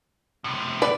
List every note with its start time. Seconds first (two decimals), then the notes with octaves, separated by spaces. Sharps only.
0.44 A2 C3
0.82 B4 D5